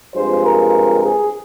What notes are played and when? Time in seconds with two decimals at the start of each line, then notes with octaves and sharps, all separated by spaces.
0.15 G2 F3 G#3 C4 C5
0.45 A#4
1.04 G#4